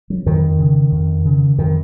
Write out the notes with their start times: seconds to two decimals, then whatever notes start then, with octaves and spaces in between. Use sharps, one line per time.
0.10 F#3
0.26 F2 D#3
0.59 C#3
0.92 F2
1.25 C#3
1.58 F2 D#3